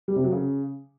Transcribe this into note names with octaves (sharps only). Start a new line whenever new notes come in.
G3
C3
F#3
C#3